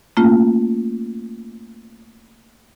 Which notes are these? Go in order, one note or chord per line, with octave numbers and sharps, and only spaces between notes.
A3 A#3 C#4 F4